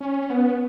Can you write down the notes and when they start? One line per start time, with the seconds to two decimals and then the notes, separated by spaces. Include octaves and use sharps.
0.01 C#4
0.30 B3